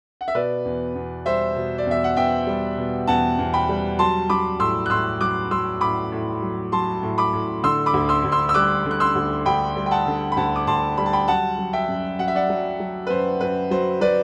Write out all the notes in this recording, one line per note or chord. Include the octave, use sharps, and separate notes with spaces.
F#5
E5
B2 B4 D5
E2
E2
G3 C5 E5
B2
D5
E2 E5
F#5
E2 E5 G5
G3
B2
E2 F#5 A5
E2
G5 B5
G3
F#3 A5 C6
F#3 B5 D6
A2 C6 E6
F#6
A2 C6 E6
F#3 D6 F#6
F#3 C6 E6
A2 B5 D6
A2
F#3
F#3 A5 C6
A2
B5 D6
A2
D3 C6 E6
B5 D6
D2
C6 E6
D2
C6 E6
E6
G3 D6 F#6
D3
F#6
C6 E6
D2
D2 G5 B5
G3
G5
F#5 A5
D3
B5
D2 F#5 A5
D6
D2 A5 C6
G3 B5
A5
G5 B5
F#3 F#5 A5
F#3
E5 G5
F#2
F#2 F#5
E5
D5 F#5
F#3
F#3
B4
F#2 C5
F#2 B4
F#3 C5
F#3 B4 D5